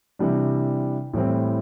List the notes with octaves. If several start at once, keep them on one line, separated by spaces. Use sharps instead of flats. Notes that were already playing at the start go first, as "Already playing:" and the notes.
C3 E3 G3 D4
A2 E3 G3 C4